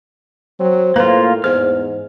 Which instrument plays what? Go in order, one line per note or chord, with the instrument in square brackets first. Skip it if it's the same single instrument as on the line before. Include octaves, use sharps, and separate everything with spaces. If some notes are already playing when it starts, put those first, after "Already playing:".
[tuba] F#3 [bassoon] C4
[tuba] A2 [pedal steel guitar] A#3 F4 [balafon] B4
[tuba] E2 [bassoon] G#2 [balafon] C5 [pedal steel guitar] F6